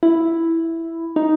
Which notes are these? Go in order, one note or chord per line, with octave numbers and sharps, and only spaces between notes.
E4
D#4